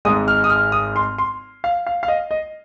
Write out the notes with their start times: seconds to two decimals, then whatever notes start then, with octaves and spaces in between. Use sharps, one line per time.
0.05 G#1 G#2 G#3 D#6
0.28 F6
0.44 D#6
0.50 F6
0.72 D#6
0.96 C6
1.18 C6
1.64 F5
1.87 F5
2.03 F5
2.08 D#5
2.31 D#5